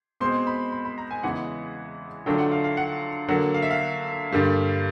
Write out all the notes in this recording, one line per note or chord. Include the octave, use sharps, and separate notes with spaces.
B2 G#3 C4 C6
B5
B5
B5
A#5
G#5
E2 C#3 E3 G#3 F#5
D3 F#3 A3 D4 F4 G5
F#5
F5
F5
F#5
D3 F#3 A#3 F#5
F5
E5
F5
G2 D3 G3 A#3